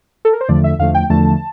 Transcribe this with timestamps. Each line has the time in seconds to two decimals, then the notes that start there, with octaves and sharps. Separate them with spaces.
0.25 A4
0.33 A#4
0.41 C5
0.49 E2 D3 F3 A3 D5
0.64 E5
0.79 E2 D3 F3 A3 F5
0.94 G5
1.10 E2 D3 F3 A3 A5